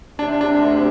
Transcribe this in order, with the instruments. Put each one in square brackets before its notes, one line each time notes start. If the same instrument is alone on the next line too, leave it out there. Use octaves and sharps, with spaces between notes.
[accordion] C3 [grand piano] D4
[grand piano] D4
[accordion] D2